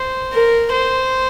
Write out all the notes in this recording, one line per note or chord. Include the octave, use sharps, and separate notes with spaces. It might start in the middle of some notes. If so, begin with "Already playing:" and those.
Already playing: C5
A#4
C5